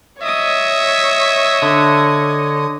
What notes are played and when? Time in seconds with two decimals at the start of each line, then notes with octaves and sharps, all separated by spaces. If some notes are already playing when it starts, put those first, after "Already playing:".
0.22 C#5 D#5 E5 D#6
1.62 D3